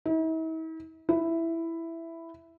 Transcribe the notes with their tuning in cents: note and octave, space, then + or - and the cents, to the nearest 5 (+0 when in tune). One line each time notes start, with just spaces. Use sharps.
E4 -45
E4 +5